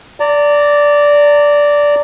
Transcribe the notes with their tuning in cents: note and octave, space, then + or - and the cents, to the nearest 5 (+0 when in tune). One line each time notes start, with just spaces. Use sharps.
D5 -10 A#5 -40